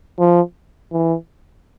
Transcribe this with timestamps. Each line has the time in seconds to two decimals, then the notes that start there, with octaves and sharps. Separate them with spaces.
0.19 F3
0.92 E3